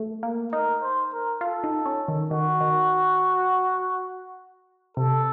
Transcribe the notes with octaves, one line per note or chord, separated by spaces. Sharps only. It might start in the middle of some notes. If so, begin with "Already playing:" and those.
Already playing: A3
A#3
D#4 A#4
C5
A#4
F4 A4
D#4
C#4
D#3
D#3 F#4
D#3
C3 A4